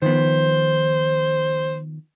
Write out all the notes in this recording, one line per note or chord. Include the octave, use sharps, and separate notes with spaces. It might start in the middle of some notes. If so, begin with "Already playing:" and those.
D#3 F3 B3 C5